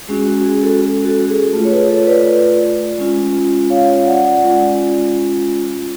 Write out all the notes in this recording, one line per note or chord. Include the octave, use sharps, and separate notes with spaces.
G#3 C#4 F#4 G#4
F#4
G#4
F#4 A4
F#4 A4
G#4
A3 F4 G#4
C#5
G#4 B4
A4 C#5
B4 D5
G#3 C#4 F4
C#5 F5
D5 F#5
G#3 C#4 F4